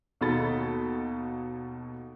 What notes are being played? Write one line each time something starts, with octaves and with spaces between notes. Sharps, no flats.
D#2 B2 D#4 A4 B5 A6